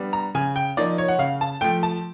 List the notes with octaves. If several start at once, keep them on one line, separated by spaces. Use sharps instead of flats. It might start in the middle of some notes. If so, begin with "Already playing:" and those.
Already playing: G3 B3 D4
A#5
C#3 G#5
G5
F3 A#3 D#4 D5
C#5
F#5
C#3 F5
A5
F3 A3 G5
A5